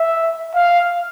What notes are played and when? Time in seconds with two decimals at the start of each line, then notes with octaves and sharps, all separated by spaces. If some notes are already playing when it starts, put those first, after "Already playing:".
Already playing: E5
0.55 F5